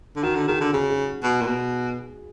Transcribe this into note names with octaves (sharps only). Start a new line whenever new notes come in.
D3
D#3 F#4
D3
D#3 G#4
D3
C#3 G#4
G#4
B2
A#2
B2